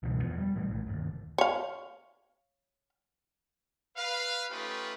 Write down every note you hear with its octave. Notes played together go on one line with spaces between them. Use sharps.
C#2 G2 B2 E3
E2 E3 F3 B3
G3
A2 E3 G3
A#1 A2
G1 D#2
C#5 F5
B4 F5
A3 C#4 D#4 F4 G4 B4